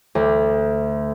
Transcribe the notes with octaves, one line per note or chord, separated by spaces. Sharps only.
D2